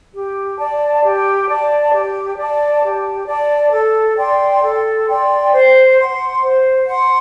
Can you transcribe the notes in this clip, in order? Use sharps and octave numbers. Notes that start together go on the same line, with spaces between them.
G4
D5 A5
G4
D5 A5
G4
D5 A5
G4
D5 A5
A4
D5 G5 C6
A4
D5 G5 C6
C5
F#5 C6
C5
F#5 C6